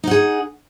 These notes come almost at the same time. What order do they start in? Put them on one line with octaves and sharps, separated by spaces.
D#4 F#5 G#4